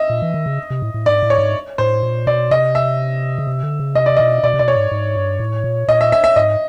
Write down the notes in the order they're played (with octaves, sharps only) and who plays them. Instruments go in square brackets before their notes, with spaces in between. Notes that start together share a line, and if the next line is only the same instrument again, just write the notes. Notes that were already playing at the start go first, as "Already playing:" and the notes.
Already playing: [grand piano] D#5 E5
[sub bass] A#2
E3
D#3
C#3
C3
A2
A2
[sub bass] G#2 [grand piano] D5
[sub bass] A2
[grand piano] C#5
[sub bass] G#2
[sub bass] A2 [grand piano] C5
[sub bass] A#2
[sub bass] B2 [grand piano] D5
[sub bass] C3 [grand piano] D#5
[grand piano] E5
[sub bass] C#3
C3
D3
C#3
[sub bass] C3 [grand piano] D#5
[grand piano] D5
[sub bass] B2 [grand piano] D#5
[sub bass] B2 [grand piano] D5
[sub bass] C3
[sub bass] B2 [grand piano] D5
[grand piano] C#5
[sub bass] G#2
G#2
G2
A2
A#2
[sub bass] A#2 [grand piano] D#5
[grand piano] E5
E5
E5
[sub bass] G#2 [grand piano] D#5